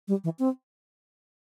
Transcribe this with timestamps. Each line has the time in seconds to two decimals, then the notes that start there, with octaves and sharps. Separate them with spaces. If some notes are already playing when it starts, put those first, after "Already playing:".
0.08 G3
0.24 E3
0.39 C4